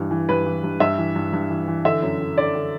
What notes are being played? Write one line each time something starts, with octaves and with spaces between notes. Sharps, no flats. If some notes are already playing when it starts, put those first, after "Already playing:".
Already playing: G2 E3
E3
G2 B4
E3
G2
G2 E5
E3
G2
G2
E3
E3
D3 E5
F#2
D3
D3 D5
D3